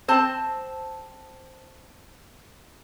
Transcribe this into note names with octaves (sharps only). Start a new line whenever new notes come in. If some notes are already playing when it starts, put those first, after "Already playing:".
C4 C5 A5